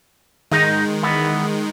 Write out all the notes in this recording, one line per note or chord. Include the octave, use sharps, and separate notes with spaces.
G#2 D#3 G#3 D#4 D#5
E3 B3